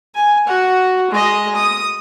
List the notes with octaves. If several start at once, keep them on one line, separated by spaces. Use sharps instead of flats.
G#5
F#4 F#5
G#3 D#5
D#6